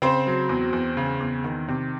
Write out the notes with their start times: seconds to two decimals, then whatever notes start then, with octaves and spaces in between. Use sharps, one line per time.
0.02 C#3 C4 C5
0.27 F#3
0.49 E2
0.73 E2
0.97 C#3
1.21 E2
1.44 D#3
1.68 C3